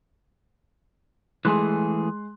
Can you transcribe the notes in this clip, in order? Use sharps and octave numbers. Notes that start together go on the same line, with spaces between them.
E3 G#3 A3 G#4 C6 F#6